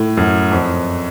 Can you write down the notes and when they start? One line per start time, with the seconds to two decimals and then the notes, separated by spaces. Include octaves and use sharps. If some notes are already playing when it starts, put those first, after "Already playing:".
Already playing: A2
0.17 F#2
0.52 F2